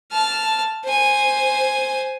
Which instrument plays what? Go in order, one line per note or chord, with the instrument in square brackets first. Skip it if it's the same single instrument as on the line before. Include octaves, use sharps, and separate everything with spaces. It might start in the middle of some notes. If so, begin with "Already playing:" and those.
[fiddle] A5 F6
C5 G#5